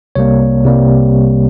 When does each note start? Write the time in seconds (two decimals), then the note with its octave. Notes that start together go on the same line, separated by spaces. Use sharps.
0.15 C2 C3 G3 A#3 C#5
0.64 C2 C3 G3 A#3